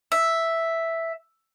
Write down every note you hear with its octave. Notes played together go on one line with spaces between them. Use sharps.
E5